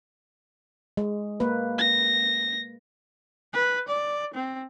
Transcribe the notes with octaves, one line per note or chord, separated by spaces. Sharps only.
G#3
A#3 B4
A#6
B4
D5
C4